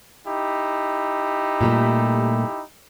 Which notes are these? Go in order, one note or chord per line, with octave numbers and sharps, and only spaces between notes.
D#4 E4 G4
A#2 G3 A3